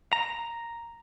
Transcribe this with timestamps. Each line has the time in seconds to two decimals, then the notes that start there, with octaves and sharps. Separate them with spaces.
0.13 A#5